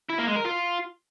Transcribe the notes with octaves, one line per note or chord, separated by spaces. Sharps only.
E4
A#3
G#3
A#4
F4